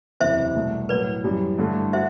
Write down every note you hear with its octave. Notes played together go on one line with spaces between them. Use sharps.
F#1 E2 C3 E3 C5 E5
C2 B2 A3
A2 F#3 B3 E4 B4 D5
F#2 E3 G3
G2 D3 A3 E4 A4
F#4 C5 E5